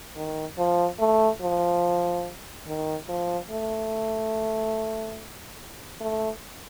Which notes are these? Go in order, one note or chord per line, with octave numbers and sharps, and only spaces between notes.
D#3
F3
A3
F3
D#3
F3
A3
A3